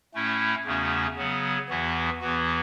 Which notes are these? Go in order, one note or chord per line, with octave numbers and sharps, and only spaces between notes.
A2 A3 C#4 E4
E2 C#3 A3 C#4 F#4
C#3 F#3 B3
E2 E3 B3 F#4
E2 E3 B3 F#4